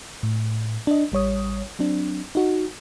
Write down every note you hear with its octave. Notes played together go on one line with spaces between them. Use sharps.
A2
D4 D#5
A1 G3 C#5 D#6
F#3 C4 D4
D#4 F#4